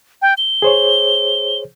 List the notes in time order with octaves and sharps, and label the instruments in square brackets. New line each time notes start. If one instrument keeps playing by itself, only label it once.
[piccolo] G5
G7
[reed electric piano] G#4 C5 C#5